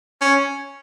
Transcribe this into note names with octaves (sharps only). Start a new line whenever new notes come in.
C#4